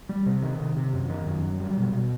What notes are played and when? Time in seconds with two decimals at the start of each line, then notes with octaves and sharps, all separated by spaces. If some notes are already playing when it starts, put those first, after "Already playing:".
0.09 G3
0.26 C3
0.42 D#3
0.59 C3
0.76 C3
0.93 F#2
1.10 D#3
1.26 F#2
1.43 F#3
1.60 G3
1.77 B2
1.93 B2